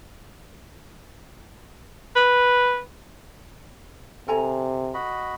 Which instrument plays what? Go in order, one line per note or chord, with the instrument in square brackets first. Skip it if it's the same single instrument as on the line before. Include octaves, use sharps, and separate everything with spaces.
[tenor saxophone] B4
[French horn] C3 [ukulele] A4 G#5 A#5
[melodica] F#4 D#5 B5